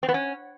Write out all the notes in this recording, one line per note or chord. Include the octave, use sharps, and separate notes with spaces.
C4
B3
C#4